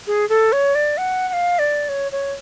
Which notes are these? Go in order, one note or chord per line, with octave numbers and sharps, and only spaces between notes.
G#4
A4
C#5
D5
F#5
F#5
F5
D5
C#5
C#5